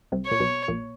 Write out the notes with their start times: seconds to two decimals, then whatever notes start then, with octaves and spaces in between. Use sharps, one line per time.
0.12 C2 C3
0.26 C#5
0.31 A#2
0.40 B1 B2
0.68 A#1 A#2